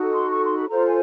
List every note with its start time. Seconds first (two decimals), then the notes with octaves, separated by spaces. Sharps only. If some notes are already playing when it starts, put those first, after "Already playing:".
Already playing: D#4 F#4 A4
0.13 C6
0.31 C#6
0.44 C6
0.56 B5
0.68 F4 A4 C5 A#5
0.86 G#5